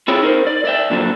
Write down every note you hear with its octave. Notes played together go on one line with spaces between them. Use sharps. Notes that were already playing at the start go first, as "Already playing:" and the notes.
C4 E4 F4 G#4 C#5 G5
D#4 A#4 C5
D5
D5 E5 G5
A#2 D3 F3 F#3 D4